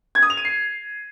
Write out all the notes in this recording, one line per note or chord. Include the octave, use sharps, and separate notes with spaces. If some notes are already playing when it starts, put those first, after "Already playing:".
G#6
D#6
F7
D#7
C7